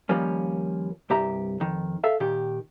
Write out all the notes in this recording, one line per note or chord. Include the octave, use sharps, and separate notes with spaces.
D#2 F3 G3 A#3 C#4
C2 G2 G4 E5 A#5
F2 D#3
A4 E5 F5
A#2 D#3 G4